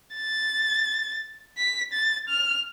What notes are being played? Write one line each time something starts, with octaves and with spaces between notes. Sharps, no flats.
A6
B6
A6
F6